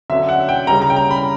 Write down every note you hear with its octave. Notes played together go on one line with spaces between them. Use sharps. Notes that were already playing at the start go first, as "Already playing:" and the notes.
D3 F#3 C#4 E5
F#5
G5
C#3 G3 C#4 A#5
A#5
G5
A#5
B5